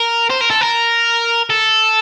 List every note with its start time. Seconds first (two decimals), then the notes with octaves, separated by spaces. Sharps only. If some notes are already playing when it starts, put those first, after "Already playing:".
Already playing: A#4
0.30 C5
0.41 A#4
0.51 A4
0.61 A#4
1.50 A4